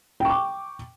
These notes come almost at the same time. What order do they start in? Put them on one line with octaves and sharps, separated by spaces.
G5 C#6 D6